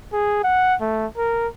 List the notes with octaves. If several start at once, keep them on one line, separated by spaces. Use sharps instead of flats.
G#4
F#5
A3
A#4